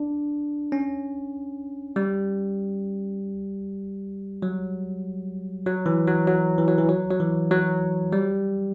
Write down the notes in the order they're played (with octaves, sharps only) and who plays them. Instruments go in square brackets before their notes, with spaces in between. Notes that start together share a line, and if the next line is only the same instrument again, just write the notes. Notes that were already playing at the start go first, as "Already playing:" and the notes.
Already playing: [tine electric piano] D4
C#4
G3
F#3
F#3
E3
F#3
F#3
E3
F#3
E3
F#3
F#3
E3
F#3
G3